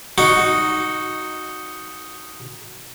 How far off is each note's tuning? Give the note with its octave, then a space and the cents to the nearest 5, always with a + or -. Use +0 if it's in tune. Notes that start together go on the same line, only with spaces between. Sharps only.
D#4 +0 F#4 +0